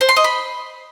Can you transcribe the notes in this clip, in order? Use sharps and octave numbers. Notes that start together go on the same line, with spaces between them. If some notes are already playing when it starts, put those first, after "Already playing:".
C5
C6
D#5
B5